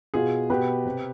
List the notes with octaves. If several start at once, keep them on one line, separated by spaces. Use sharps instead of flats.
B2 F4 G#4
B2 G4 B4
C3